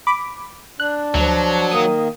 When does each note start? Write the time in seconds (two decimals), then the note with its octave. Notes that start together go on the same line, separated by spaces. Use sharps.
0.07 B5 D6
0.80 D4 F#6
1.15 D2 F3 F#3
1.71 D#3 A#3 D#6